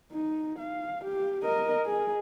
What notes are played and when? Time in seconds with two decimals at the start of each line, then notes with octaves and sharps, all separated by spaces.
0.12 D#4
0.58 F5
1.04 G4
1.43 A#4 D#5
1.86 G#4